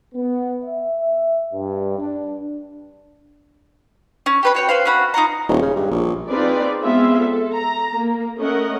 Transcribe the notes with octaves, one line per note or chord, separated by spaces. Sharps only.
B3
E5
G2
D4
C#4
G4 B4 B5
F#4 C#5 G5
B4 C5 F5
C#4 F#4 B5
D#4 F4 F#5 A#5
D#1
C#3
G2
A#1
C4 D#4 F4 G#4 B4 D5
G#3 B3 C4 F4 G#4 E5
A4
A#5
A#3
A3 C#4 A#4 D#5 F#5